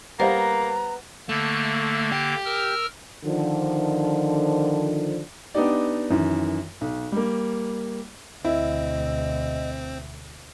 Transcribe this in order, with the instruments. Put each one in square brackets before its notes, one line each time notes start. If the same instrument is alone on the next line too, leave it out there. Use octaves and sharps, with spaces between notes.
[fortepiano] G3 C5 F5 [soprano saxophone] A#3 [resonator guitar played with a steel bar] B3 [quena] A#5
[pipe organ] D3 A#3 [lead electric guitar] A3
[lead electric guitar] G4
[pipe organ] A#4 E6 F6
[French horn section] D3 D#3 F3
[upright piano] B3 D4 D#4 G4 D5
F#2 D#3 E3
B1
G3 A#3
[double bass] D2 B2 [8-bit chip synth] C4 [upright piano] E4 [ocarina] D#5